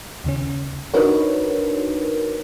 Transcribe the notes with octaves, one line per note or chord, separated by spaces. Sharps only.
D#2 C#3 C#4
D4 D#4 F#4 A#4 B4 C#5